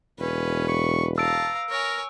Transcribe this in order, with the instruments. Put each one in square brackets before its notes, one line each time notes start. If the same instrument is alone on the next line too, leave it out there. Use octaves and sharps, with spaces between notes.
[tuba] E1 [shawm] C#4 [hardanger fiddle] B4
[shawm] C#6
[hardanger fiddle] F5 A#5 [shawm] A5 [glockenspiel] E6 D7
[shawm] A#4 [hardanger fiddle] C#5 G#5